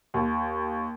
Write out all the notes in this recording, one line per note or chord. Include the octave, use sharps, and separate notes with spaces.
D#2